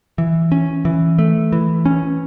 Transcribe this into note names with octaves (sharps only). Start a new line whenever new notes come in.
E3
C#4
E3
A3
E3
C#4